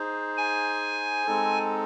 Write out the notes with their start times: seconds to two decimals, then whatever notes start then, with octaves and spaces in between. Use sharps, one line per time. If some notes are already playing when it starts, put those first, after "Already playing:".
Already playing: D#4 G#4 C5
0.37 G#5
1.26 G#3 C4 D#4 A4